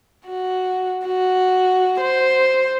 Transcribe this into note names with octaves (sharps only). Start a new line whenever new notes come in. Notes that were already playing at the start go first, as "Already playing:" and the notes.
F#4
F#4
C5